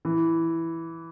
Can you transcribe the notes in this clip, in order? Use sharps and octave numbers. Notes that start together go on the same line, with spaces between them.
E3